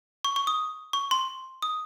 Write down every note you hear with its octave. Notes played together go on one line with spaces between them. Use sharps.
C#6
C#6
D#6
C#6
C6
D#6